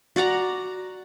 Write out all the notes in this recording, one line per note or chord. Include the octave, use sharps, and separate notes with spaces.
F#4 D5 F#5 A#5